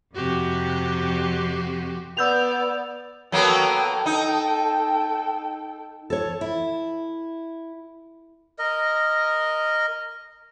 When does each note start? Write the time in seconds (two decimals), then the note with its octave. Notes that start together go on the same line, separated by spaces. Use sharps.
0.15 F2 C3 F#4 G4
2.17 B3 D5 E6 G6 F7
3.32 F#3 A#3 B3 A4 G5
4.06 D#4
6.10 A4 C#5
6.41 E4
8.59 A#4 D#5